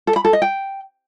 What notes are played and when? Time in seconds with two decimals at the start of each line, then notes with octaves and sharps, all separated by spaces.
0.07 A4
0.16 B5
0.25 A4
0.33 D#5
0.42 G5